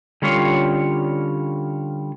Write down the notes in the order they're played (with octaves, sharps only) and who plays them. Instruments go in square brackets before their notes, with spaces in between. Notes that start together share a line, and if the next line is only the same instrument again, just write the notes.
[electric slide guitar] D3 G3 C#4 F4 C#5